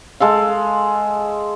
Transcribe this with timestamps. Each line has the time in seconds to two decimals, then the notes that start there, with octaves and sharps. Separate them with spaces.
0.20 G#3 A4 F5